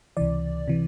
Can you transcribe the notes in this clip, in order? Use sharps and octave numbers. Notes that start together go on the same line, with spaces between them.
C#2 C3 E3 D5
C3 E3